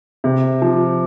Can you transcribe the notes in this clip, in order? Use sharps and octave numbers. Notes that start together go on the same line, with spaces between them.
C3
F3